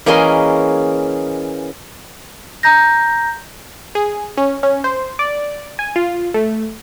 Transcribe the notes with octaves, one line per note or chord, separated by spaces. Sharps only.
E3 A#3 C#4 G#4 D#5 C6
A#5 G6 A#6
G#4
C#4
C#4
C5
D5
G#5
F4
A3